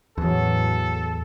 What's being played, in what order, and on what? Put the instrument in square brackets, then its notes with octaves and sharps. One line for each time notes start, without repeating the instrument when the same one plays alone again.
[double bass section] A1 E3 F#3 [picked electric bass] E2 [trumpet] A4